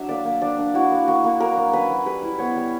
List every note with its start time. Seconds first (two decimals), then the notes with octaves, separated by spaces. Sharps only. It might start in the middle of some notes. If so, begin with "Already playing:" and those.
Already playing: F#3 D4 E5
0.08 A#3 D5
0.25 A#3
0.41 D4 D5
0.58 D4
0.74 E4 F#4
0.91 A#3
1.07 A#3 F#4
1.24 A#3
1.40 F#3 A#4
1.57 F#3
1.73 C#4 B4
1.89 F#3
2.06 G3 B4
2.22 E4
2.38 B3 C#5
2.56 G3